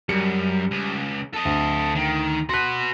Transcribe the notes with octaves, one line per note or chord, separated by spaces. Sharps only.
F#2 G3 C#7
C#2
A4 D#5
D2
D#3
F#4 B4 C6 F#6